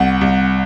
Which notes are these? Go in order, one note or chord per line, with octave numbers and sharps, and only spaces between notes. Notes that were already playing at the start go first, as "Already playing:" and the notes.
Already playing: C2 F#5
C2